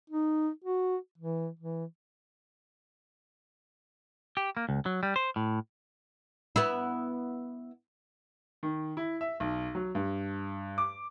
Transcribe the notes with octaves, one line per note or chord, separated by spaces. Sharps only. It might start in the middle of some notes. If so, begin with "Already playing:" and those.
D#4
F#4
E3
E3
G4
A#3
C#2
F#3
G3
C5
A2
B3 E4
D#3
E4
E5
B1
F#3
G2
D6